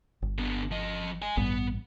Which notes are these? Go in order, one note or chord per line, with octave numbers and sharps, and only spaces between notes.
G1
D3 B3
F3 D#5
D#5 G#5
A1 G2 B3